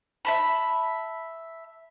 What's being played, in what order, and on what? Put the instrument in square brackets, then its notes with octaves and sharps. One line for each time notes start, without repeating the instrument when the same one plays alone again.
[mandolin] E5 A5 B5